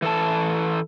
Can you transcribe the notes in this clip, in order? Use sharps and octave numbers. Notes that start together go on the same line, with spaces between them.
E3 A4 A5